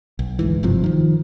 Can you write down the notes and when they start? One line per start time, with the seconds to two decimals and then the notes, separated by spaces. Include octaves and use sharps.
0.19 B1
0.39 D2 G#2 E3
0.63 F#1 G2 C3 F3
0.84 D#3 F3